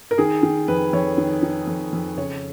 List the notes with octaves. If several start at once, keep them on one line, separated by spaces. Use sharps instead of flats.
A#4
D#3 G#4
D#3
F2 B4
F2 C#5
D#3
D#3
F2
F2
C#3 C#5